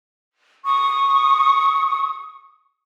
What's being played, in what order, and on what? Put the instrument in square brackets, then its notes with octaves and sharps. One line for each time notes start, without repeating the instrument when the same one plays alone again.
[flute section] C#6 D#6